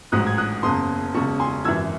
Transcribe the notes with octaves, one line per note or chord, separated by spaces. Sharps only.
A1 G#2 F#3 D#6 F#6
G#6
D#6 F#6
F#1 E2 C#3 C6 D#6
E1 E2 C#3 A5 C#6
G#5 C6
G#1 F#2 E3 E6 G#6